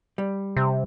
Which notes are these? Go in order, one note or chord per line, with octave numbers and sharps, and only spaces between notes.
G3
C3